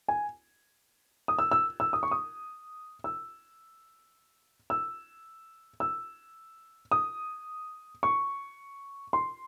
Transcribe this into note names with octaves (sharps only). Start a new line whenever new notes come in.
G#5
D#6
E6
E6
E6
D#6
C#6
D#6
E6
E6
E6
D#6
C#6
C6